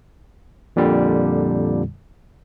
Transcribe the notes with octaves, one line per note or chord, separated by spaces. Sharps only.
F2 A#2 D3 G3